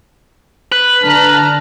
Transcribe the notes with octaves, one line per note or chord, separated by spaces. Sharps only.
B4
D3 A5 A#5 F6